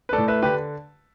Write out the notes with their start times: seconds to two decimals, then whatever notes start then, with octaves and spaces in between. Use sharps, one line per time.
0.09 B4
0.13 A3 A4 D5
0.18 A2
0.28 B4 E5
0.43 D3 G4 B4